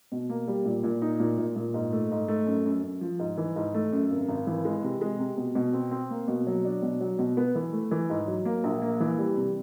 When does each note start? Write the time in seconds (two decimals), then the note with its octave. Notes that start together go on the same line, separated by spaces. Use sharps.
0.12 B2
0.29 A#3
0.48 G3
0.65 A#2
0.84 A#2
1.02 D#4
1.20 A#2
1.38 A#2
1.56 A#2
1.74 G#2
1.93 A3
2.11 G#2
2.28 A3
2.47 F#2
2.65 F#2
2.83 F#2
3.01 F3
3.19 G#2
3.38 E3
3.56 G#2
3.74 A3
3.92 F#2
4.10 G#1
4.29 G#1
4.47 E3
4.65 G#3
4.83 C3
5.01 G#3
5.19 C3
5.38 B2
5.55 B2
5.73 C4
5.91 C4
6.10 A#3
6.28 B2
6.47 F#3
6.65 D4
6.82 B2
7.00 F#3
7.19 B2
7.37 B3
7.55 E3
7.73 A3
7.91 E3
8.10 G#2
8.27 F#3
8.45 A#3
8.64 A#1
8.82 A#3
9.00 E3
9.18 G3
9.36 C3